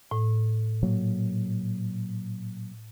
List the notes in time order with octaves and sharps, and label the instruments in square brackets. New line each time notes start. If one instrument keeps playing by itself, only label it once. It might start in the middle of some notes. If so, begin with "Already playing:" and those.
[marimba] A2
[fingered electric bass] A#2 F#3 A#3